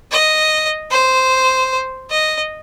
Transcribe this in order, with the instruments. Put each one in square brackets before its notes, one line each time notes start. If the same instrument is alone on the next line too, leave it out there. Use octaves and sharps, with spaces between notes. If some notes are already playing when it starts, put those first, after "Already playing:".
[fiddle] D#5
C5
D#5